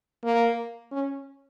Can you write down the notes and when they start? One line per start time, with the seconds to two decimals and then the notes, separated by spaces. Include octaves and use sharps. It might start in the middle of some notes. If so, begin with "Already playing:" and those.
0.24 A#3
0.92 C#4